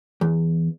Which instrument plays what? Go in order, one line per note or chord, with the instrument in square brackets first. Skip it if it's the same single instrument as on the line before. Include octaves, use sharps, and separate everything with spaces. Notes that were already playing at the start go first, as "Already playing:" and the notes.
[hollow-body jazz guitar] E2